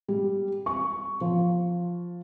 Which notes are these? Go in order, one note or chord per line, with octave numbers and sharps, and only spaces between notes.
G3
C#6
F3